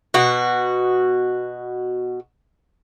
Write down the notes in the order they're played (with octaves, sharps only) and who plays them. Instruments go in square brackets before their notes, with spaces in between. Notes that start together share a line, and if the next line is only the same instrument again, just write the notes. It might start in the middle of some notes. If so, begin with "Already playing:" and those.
[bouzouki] B2 F#4